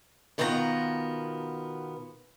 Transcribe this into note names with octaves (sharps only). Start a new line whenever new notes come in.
B2 D#3 B3 F4 A#4 A#5